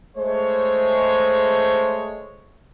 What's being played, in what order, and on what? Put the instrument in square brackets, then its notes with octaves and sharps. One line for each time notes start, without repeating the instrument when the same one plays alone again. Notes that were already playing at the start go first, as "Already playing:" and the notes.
[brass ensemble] G#3 A3 C5 C#5